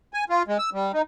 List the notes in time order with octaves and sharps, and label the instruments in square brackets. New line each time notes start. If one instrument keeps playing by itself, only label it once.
[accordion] G#5
F4
G#3
E6
G3
D#4